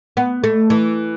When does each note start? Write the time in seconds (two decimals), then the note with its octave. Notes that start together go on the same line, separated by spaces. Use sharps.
0.17 B3
0.44 A3
0.70 E3